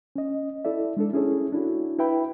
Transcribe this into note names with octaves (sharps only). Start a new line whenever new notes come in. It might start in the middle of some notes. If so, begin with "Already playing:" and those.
C#4 D#5
E4 A4 D5 E5
G#3 D4 A4
C#4 E4 G#4 A4 C#5
D4 E4 F#4
E4 B4 E5 G5 B5